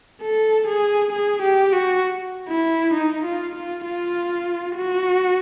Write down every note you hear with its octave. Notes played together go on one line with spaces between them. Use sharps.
A4
G#4
G#4
G4
F#4
E4
D#4
F4
F4
F4
F#4